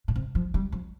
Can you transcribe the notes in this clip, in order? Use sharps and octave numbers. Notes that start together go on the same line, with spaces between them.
A#2
C3
F3
G3
F3